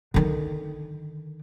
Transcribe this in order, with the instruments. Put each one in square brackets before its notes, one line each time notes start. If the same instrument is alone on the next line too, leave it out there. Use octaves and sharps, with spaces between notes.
[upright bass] D3 D#3